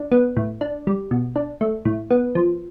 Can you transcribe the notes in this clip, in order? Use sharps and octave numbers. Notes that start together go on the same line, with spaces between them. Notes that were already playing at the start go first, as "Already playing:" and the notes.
Already playing: D4
B3
A2
D4
G3
B2
D4
A3
A2
B3
F3